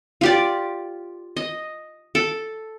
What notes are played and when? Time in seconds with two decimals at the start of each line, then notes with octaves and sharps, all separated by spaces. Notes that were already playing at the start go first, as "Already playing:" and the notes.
0.21 F4 G4 D5
1.37 D#5
2.15 A4